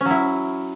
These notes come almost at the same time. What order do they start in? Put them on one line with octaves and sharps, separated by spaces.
C#4 F#3 E4